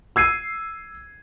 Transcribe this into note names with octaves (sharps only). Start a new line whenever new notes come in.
E6 G#6 C7 D#7